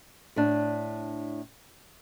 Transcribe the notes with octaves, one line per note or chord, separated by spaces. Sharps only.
A2 D4